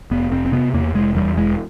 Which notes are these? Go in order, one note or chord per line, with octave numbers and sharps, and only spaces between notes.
F1 B3
F1 C4
C4
C3 B3
E2 A#3
F1 G#3
E2 G3
E1 G#3